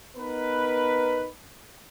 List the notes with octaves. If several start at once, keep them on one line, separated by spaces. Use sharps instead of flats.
B3 D#4 A#4 B4